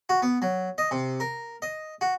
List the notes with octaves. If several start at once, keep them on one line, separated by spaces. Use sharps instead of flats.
F#4
B3
F#3
D#5
C3
A#4
D#5
F#4